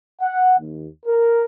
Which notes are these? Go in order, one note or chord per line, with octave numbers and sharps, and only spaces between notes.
F#5
D#2
A#4